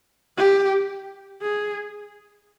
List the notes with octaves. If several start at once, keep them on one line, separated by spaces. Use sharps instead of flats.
G4
G#4